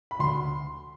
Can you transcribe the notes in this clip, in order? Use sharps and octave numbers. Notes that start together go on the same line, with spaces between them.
B5
D2 C6